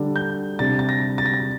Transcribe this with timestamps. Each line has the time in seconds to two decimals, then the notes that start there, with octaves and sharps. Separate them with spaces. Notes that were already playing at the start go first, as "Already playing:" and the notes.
Already playing: D3 G3 D4
0.16 G6
0.59 C3 G3 D4 A6
0.79 A6
0.89 A#6
1.18 A6
1.26 A#6
1.33 A6